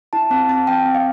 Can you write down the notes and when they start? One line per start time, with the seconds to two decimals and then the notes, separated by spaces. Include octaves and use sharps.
0.13 E4 A5
0.31 C4 A5
0.49 C4 A5
0.67 C4 G5
0.85 C4
0.95 F5